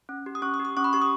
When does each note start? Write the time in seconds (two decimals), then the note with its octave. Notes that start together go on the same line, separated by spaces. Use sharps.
0.09 C#4
0.26 G4
0.35 D#6
0.42 C#4 C#6
0.54 D#6
0.60 G4
0.65 D#6
0.77 C#4 C#6
0.84 B5
0.93 G4 C#6
1.02 D#6